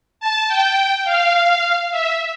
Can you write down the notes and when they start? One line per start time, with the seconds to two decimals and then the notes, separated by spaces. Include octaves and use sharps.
0.20 A5
0.48 G5
1.05 F5
1.91 E5